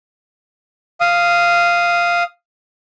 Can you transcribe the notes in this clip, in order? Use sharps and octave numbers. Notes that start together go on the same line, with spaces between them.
F5 D#6